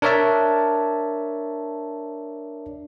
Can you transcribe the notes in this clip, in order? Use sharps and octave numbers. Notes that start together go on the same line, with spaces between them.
D4 A#4 C#5 D5 E5 A5